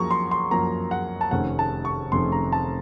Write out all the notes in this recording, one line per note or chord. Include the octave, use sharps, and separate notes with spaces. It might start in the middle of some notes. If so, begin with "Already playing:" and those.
Already playing: F#2 F3 A#3 A#5 C#6
C6
C6
F#2 F3 A#3 A#5
F#5
A5
F1 F2 D#3 A3 C#4 F#5
A5
C#6
F1 F2 D#3 A3 C#4 C6
A#5
A5